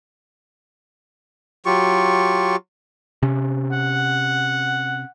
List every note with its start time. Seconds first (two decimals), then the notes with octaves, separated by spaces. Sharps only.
1.66 F#3 F4 G4 C#6
3.23 C3 C#4
3.72 F#5